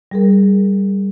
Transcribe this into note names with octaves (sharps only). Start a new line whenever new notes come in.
G3 G#4 A#4